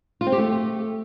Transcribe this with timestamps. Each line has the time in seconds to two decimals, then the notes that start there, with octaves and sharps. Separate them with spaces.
0.21 F4
0.27 C4
0.32 G4
0.38 A3